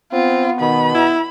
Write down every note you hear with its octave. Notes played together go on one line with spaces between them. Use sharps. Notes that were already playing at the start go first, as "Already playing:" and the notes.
B3 C4 F4
B2 D#3 B5
E4